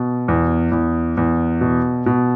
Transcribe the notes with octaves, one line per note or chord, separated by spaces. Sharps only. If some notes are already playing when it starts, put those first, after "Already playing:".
Already playing: B2
E2
E2
E2
B2
B2